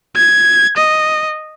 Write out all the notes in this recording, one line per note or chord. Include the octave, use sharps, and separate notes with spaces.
G#6
D#5